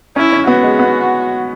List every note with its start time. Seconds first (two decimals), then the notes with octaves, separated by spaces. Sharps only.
0.16 C#4 E4
0.33 C#4
0.47 B3 F#4
0.63 G#3
0.79 B3